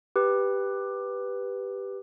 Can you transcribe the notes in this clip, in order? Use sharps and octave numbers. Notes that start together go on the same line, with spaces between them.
G4 B4